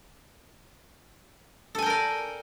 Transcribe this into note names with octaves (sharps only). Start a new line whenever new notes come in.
A4 A#4 D5 G5 G#5